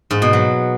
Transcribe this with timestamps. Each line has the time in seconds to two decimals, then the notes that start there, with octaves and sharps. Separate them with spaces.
0.11 G#2
0.22 B2
0.33 F#3